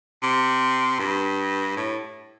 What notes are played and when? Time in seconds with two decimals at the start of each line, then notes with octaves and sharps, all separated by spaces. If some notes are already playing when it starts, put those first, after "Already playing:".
0.23 C3
0.99 G2
1.76 A2